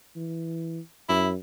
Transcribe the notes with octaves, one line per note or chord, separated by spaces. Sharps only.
E3
F#2 E4